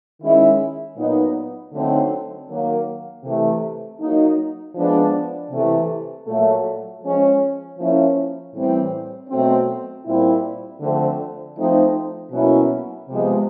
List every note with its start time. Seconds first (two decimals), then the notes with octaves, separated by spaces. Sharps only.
0.21 D#3 G#3 C#4 E4
0.96 A#2 F#3 B3 D#4
1.72 D3 F#3 A3 C4 D#4
2.48 D#3 F#3 A#3
3.24 C3 E3 A3
3.99 F#3 A#3 D#4
4.75 F3 G#3 B3 D4
5.50 C3 E3 A3 C4
6.26 A#2 F#3 A3
7.02 F3 G#3 C#4
7.77 F3 A#3 C#4 E4
8.53 A2 E3 G3 C4
9.29 B2 F#3 A3 C4
10.05 A#2 G3 C4 E4
10.80 D3 F3 A3 C4
11.57 F3 A3 C4 D#4
12.31 B2 F#3 A#3 C#4 E4
13.08 C3 F3 G#3 B3